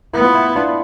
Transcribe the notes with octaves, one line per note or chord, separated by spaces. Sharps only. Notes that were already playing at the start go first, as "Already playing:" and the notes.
B3 E4
F4
E4
D4 F4